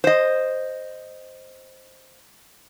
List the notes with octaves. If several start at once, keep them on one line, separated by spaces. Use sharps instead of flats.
C5 D#5